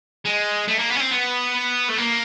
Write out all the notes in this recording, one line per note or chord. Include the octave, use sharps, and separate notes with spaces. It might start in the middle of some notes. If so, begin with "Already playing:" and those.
G#3
A3
A#3
B3
C#4
C4
B3
A3
A#3